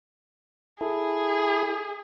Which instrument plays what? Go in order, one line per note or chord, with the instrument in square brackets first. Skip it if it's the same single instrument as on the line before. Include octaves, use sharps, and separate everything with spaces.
[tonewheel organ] E4 A4 [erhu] G#4